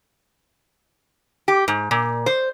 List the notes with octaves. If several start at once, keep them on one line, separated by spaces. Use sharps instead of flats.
G4
G#2
A#2
C5